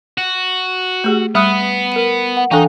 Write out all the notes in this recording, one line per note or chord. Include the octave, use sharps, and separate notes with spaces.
F#4
A3 G4 G#4
G3 B3 B5 D#6 F#6
A#4 C#7 D#7
F#5
E3 D4 D#4 A4 F5 G5 G#5